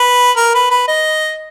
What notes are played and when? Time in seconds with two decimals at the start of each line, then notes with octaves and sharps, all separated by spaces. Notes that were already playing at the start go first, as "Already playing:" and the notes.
Already playing: B4
0.37 A#4
0.54 B4
0.70 B4
0.87 D#5